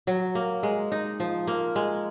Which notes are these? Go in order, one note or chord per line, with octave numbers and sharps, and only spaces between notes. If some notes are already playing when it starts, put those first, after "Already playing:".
F#3
A#3
G#3
D#4
F3
A#3
G#3